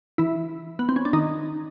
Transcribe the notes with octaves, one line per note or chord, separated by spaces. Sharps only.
E3 E4
B3
C4
C#4
D4
D#3 D#4